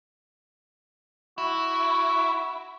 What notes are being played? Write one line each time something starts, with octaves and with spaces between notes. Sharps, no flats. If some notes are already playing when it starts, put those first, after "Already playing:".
E4 F#4